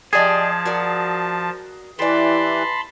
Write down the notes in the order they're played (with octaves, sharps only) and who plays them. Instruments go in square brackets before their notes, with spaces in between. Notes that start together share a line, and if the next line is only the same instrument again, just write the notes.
[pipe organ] F3 A5 [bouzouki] G4 D5 D#5 [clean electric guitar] G#4
[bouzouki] F#4 A#4 D5
[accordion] E3 [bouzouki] G4 D5 [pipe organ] A5 B5 C6